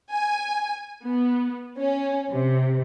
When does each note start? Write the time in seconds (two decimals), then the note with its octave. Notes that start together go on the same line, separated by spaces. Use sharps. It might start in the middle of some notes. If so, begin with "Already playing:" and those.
0.12 G#5
1.05 B3
1.81 C#4
2.34 C3